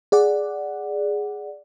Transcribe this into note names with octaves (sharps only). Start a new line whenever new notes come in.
G#4 D5 F#5